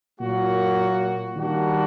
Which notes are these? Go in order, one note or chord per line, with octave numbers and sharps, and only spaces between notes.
A#2 F#3 A#3 F#4
D#3 G3 A#3 D4 F#4